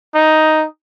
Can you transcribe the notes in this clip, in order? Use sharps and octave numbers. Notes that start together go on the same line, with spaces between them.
D#4